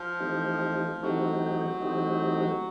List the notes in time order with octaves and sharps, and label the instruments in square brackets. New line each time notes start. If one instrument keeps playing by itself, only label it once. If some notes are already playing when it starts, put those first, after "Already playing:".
Already playing: [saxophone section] F3
[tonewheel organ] E3 A3 C4 D#4 G4
[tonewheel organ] E3 A3 C4 D#4 G4 [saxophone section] F#3
[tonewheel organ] E3 A3 C4 D#4 G4